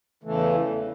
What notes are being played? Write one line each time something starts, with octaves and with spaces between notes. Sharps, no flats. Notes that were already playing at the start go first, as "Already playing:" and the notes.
E2 C#3 E3 A3